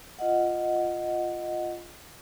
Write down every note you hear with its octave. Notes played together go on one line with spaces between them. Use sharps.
F4 D#5 F#5